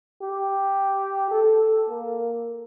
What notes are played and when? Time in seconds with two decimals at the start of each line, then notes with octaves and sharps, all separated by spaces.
0.22 G4
1.31 A4
1.90 A#3